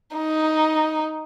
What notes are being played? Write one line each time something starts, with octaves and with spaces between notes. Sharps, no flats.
D#4